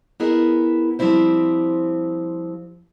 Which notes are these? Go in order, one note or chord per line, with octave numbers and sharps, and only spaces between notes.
B3 E4 G#4 A#4 D#5
F3 G3 C4 E4 C5